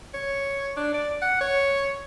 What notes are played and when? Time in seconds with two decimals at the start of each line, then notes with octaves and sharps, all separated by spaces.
0.14 C#5
0.76 D4
0.94 D5
1.22 F#5
1.41 C#5